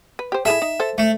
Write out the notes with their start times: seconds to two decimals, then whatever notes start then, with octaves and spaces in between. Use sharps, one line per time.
0.19 B4
0.32 G4 C5
0.45 E4 G#4 A4 E5
0.62 D#4
0.80 A4 C5
0.98 A3